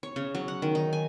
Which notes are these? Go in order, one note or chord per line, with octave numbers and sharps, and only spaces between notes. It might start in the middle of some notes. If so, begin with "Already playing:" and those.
C#5
C#3
F#3
F#5
D#3
D#4
G#5